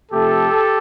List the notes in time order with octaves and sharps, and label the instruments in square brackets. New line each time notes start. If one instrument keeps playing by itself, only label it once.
[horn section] C3 F3 A3 G4 A4